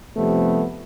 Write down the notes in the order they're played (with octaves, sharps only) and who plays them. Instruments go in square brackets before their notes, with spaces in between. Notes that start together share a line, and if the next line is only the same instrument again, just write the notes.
[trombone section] F2 C3 F3 G3 A3 B3